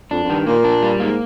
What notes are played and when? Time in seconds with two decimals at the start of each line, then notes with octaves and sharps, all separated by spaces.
0.11 F2 D4
0.24 F2
0.29 G2 D#3
0.46 A#2 A#3
0.64 D4
0.82 G3
1.00 G#2 A#3